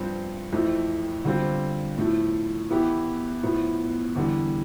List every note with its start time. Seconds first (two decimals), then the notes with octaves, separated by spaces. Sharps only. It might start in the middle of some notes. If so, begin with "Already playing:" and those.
Already playing: G2 F3 C4
0.52 F2 E3 A3 C4
1.25 D3 G3 C4 F4
1.97 A2 F3 A3
2.70 E3 B3 E4 G4
3.43 A2 F3 B3
4.16 E2 D3 G3